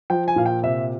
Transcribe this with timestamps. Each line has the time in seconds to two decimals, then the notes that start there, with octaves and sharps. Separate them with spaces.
0.10 F3 G5
0.28 G#5
0.36 A#2 F5
0.46 G5
0.63 C3 E5